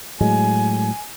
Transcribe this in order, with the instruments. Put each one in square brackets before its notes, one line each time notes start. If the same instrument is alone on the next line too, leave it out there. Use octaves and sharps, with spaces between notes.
[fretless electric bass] A2 F#3 G#3 [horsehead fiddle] G#5